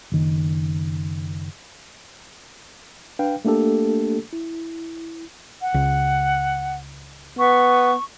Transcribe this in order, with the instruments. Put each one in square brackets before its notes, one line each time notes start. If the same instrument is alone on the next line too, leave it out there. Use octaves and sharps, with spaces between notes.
[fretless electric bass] F#1 D#3
[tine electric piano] D4 B4 F5 G5
A3 A#3 D4 G4 A4
E4
[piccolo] F#5
[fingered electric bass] C#2
[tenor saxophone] B3 [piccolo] C#6